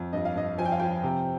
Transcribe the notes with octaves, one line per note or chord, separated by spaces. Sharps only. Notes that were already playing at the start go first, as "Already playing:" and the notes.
Already playing: F2
G2 D#5
F5
G2 D#5
F3 G#5
G5
F5
F3 G5
C3